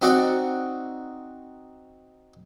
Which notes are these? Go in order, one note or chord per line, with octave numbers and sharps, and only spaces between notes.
C4 D#4 F#4 D5 F#5